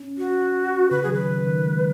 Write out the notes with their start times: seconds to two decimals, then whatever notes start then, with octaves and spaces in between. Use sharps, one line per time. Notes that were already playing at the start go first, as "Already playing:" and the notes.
Already playing: C#4
0.18 F#4
0.91 C#3 B4
1.03 F#3 G#4
1.10 D#3 B4
1.29 C#3
1.47 D#3
1.66 G#3